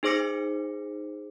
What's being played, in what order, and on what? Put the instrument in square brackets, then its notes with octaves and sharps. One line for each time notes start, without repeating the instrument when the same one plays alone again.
[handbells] D#4 G#4 C5 D6 A#6 C#7